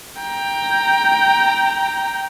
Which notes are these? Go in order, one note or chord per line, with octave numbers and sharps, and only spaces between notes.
G5 A#5